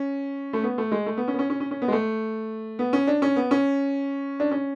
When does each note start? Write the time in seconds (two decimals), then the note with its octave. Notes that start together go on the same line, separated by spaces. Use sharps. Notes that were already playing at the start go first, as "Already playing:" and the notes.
Already playing: C#4
0.53 A3
0.63 B3
0.78 A3
0.92 G#3
1.06 A3
1.17 B3
1.28 C#4
1.34 B3
1.39 C#4
1.50 C#4
1.60 C#4
1.71 C#4
1.82 B3
1.88 G#3
1.92 A3
2.79 B3
2.93 C#4
3.07 D4
3.22 C#4
3.36 B3
3.51 C#4
4.40 D4
4.51 C#4